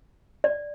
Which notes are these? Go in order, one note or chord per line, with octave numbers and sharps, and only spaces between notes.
D5